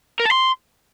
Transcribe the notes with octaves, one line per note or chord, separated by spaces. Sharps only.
A#4
A5
C6